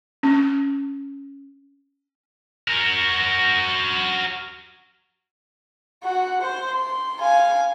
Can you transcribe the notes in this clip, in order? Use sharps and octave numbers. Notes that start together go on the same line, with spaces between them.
C#4
F#4 A#4
F#4 F#5
C5
C6
F5 G#5